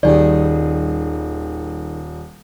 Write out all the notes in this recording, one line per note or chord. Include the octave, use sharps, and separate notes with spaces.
D#1 D#3 G3 G#4 D5